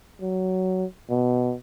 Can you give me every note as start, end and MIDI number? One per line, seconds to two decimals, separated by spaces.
0.21 0.85 54
1.10 1.54 47